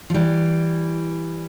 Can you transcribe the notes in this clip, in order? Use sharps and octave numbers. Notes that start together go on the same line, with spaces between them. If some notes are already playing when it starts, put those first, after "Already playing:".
F3
E3 G3